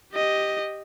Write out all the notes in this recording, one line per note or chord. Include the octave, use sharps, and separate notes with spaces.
G4 D#5